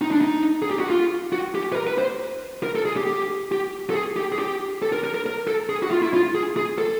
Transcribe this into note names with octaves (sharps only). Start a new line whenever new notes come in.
D#4
D4
D#4
G#4
G4
F#4
F4
F#4
G4
B4
A#4
B4
C5
A#4
A4
G#4
G4
G4
G4
A4
G#4
G4
G#4
G4
A4
A#4
A#4
A#4
A#4
A4
G#4
F#4
F4
E4
F4
G#4
G#4
A4